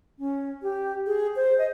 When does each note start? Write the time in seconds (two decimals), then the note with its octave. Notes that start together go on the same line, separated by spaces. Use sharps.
0.19 C#4
0.62 G4
1.07 G#4
1.36 C5
1.58 D#5